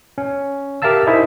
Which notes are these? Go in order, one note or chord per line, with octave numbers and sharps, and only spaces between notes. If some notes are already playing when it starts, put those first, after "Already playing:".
C#4
G4 A#4 E5 F5 A5 E6
D#4 E4 G#4 A#4 C5 E5